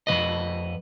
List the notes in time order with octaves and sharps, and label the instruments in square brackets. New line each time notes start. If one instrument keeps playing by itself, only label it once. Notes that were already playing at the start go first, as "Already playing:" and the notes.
[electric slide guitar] F2 D#3 B4 D#5